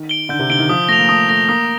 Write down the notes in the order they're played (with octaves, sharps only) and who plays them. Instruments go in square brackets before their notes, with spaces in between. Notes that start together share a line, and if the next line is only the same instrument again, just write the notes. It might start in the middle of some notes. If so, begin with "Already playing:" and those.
Already playing: [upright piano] D#3
[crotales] D7 G7
[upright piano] D3 [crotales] G6
[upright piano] C3
[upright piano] D3 [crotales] D7 G7
[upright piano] D#3
[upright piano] F3 [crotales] D#6
[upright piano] A3 [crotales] A#6 F7
[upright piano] A#3
[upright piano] A3 [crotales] D#6
[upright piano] A3 [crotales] A#6 F7
[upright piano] A#3 [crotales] D#6